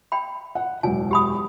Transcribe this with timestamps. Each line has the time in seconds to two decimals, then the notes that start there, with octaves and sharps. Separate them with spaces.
0.12 G5 B5
0.55 F#5
0.83 E1 F#2 G#5
1.11 G4 B5 D#6